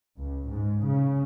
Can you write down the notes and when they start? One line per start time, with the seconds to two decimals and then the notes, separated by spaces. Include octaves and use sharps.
0.18 C#2
0.48 G#2
0.86 C#3